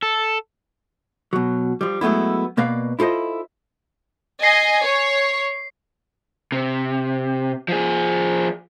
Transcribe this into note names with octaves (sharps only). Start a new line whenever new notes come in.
A4
B2 F#3
F3 G3
F#3 G#3 A3 B3 E4
B2 A#3 B4 D5 F5
E4 F4 A4 C5 D#5
D#5 G#5 C7
C#5
C3
F3 G#4